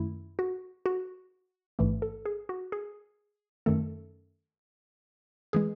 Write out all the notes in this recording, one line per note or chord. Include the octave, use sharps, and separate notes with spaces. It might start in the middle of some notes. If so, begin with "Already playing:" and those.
Already playing: F#2 D#3 A3 E4
F#4
F#4
A1 G#2 E3 A3
A4
G#4
F#4
G#4
F#2 D#3 A3 A4
E3 G#3 G#4